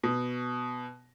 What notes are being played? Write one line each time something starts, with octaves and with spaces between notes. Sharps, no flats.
B2